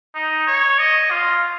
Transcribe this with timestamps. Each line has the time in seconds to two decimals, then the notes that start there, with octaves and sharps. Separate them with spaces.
0.15 D#4
0.47 C#5
0.79 D#5
1.11 F4